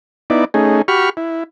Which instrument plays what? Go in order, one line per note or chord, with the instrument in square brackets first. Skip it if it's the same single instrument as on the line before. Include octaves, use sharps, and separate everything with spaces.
[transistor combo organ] B3 D#4 E4 D5
A3 C#4 D#4 G#4
F#4 G4 B5 C#6 F6
E4